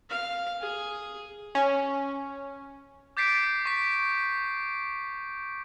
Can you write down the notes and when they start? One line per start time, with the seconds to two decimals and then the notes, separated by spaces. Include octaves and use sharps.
0.10 F5
0.61 G#4
1.55 C#4
3.17 D6 G6 A6 B6 C7 D7
3.65 C#6 B6